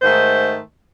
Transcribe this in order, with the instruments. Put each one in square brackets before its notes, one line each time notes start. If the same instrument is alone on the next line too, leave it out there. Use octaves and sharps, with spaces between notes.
[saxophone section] G#2 D#3 A3 C5